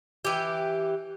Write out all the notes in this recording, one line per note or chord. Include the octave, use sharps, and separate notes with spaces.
E3 G4